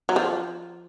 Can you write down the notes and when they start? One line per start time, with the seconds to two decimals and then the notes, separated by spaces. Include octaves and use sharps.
0.09 F#3
0.16 F3